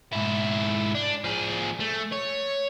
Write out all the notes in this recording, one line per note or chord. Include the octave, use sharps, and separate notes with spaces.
G#2 E4
D4
F3 G#4
A3
C#5